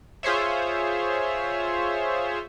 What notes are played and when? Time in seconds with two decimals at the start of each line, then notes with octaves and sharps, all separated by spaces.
0.23 F4 G#4 C5 C#5 E5